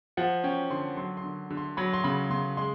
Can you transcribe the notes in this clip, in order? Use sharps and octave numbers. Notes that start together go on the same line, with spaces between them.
F3 F#5
C#4 G5
D3 C6
F#3 C6
C6
D3
D3
C6
F#3 B5
C6
C#3 B5
C#3 C6
G#3 C6